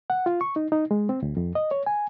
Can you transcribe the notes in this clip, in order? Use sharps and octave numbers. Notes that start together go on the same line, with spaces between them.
F#5
F4
C#6
D#4
D#4
G#3
C4
D2
F2
D#5
C#5
G#5